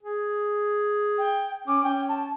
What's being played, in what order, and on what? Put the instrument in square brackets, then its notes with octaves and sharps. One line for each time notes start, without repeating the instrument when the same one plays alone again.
[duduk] G#4
[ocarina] G5
[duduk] C#4 [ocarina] D6
[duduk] C#4 [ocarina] G5
[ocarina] A5